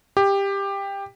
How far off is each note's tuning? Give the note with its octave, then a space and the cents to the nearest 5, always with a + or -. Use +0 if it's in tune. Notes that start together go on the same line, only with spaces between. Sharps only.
G4 +15